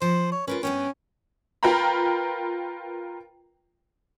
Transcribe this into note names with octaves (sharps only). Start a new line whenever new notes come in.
F3 C5
C#5
C#4 F4 A#4 B4
G2 B3 C#4 G5
F4 A#4 B4 G5 A#5 B5